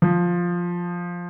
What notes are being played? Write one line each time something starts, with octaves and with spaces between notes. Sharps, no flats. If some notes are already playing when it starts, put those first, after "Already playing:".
F3